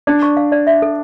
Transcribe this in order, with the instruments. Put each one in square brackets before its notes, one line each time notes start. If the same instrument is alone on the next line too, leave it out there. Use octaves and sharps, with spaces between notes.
[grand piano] D4 [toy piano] D5
[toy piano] C#6
F5
D5
E5
A4